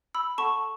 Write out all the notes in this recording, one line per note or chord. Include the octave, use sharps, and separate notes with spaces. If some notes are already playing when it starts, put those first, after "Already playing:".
B5 E6
A4 F#5 A5 C#6